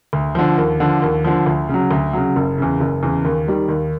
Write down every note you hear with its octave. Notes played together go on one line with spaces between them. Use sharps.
D2
D3 F3
D#2
D3 F3
D#2
D3 F3
D2
C#3
F#3
D2
C#3 F#3
F#1
E2 C#3
F#1
E2 C#3
D#2
D#3 G3
D#2